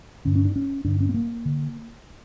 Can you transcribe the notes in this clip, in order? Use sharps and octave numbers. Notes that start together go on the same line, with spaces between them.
G2 D3 C#4
C#4
D4
C#4
G2 D3 D4
C#4
B3
A#3
D3